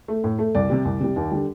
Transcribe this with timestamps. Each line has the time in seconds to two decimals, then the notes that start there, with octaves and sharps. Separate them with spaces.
0.08 A3
0.24 A2
0.39 A3
0.55 C2 D5
0.70 C3 G3
0.85 C2
1.00 C3 G3
1.16 D#2
1.32 D3 G3